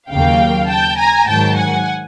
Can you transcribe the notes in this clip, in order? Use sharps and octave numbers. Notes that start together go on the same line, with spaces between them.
D#2 C#3 F#3 A#3 F5 G5
G5 A5
G#5 A#5
G#2 D#3 F#3 G5 A5
F#5 G#5